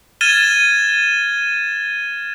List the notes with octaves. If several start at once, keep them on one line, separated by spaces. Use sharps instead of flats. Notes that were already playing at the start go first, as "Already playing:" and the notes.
F6 G#6 A6 D#7 E7 G7